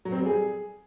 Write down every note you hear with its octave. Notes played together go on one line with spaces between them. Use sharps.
F#3
C4
G3
G#4